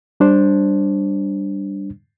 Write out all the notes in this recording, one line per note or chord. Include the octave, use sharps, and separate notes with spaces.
G3 D4 C5